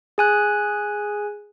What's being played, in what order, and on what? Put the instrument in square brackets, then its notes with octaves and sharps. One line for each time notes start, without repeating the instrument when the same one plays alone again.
[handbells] G#4 G#5 F#6